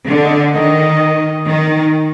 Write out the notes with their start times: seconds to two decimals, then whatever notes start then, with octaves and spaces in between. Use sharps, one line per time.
0.08 D3
0.24 D#5
0.55 D#3 D#5
1.48 D#3